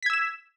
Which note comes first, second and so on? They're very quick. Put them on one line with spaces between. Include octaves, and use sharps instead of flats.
B6 G#6 E6 E7